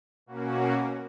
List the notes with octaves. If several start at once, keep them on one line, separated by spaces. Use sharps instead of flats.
B2 A#3 C#4 F#4